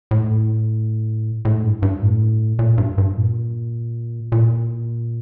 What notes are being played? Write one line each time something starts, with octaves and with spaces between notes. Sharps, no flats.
A2
A2
G2
G2
A2
A#2
G2
G2
A#2
A#2